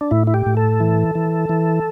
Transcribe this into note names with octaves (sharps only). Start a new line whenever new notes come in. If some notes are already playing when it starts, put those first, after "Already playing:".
D4
A2 E4
E4
G4
A2
A4
E3
E3
E3